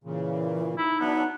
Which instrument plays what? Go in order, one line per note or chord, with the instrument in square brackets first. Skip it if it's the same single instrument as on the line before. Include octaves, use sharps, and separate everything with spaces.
[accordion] A#2 C#3 [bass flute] E3
[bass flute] D#4 [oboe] E4
[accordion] F#3 D4 E5 [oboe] B3